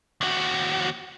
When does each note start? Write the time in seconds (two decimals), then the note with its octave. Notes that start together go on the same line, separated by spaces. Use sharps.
0.21 D#2 F#4